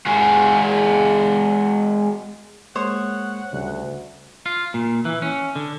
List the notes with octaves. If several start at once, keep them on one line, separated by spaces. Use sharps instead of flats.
G#3 F#4 G#4
G#3 A#3 C5 C#5 F#5 D#6
D2 C#3 G3
F4
A#2
E3
C#4
D3